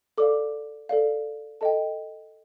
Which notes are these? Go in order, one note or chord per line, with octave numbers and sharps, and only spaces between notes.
A4 D5 F5 D6
A4 D5 F5
A4 D#5 G5 A5